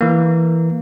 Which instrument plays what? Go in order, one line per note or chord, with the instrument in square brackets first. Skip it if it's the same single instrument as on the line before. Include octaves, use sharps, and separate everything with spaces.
[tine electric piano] E3 A#3